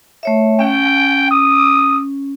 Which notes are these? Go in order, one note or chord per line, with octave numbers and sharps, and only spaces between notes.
A3 C#5 E5
C#4 G5
D#6